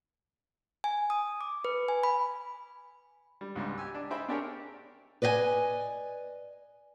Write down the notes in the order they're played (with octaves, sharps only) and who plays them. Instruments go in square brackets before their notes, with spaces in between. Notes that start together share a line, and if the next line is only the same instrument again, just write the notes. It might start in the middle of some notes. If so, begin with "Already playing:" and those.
[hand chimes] G#5
D#6
D6
B4
G#5
B5
[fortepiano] G3
C#2 G#2 G3
G4 G#5 E6
D4
D#4 G#4 C5 E5 G5 B5
C4 D4 G4 G#4 A#4 C#5
[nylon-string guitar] B4 D5 D#5 F5 G#5